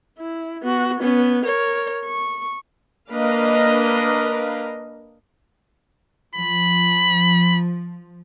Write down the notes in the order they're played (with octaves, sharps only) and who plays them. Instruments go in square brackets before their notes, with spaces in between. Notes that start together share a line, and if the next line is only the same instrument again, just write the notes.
[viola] E4
B3 F#4
B3 C#4
A#4 C#5
C#6
[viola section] A#3 D4 A#4 B4 D#5 F5
[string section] F3 [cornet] B5